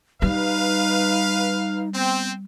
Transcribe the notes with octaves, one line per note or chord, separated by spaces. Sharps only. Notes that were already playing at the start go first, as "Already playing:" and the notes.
G3 D#4 B4 F5
B3 C4